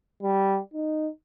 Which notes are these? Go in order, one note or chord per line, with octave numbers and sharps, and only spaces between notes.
G3
D#4